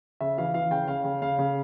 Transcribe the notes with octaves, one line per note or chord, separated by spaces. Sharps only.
C#3 E5
E3 F5
E3 F5
C#3 G5
C#3 F5
C#3
C#3 F5
C#3